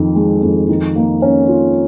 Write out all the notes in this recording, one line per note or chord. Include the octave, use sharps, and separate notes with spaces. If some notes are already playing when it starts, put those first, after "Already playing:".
Already playing: F2 D#3
G#3
F2
D#3
A#3
C#4
F4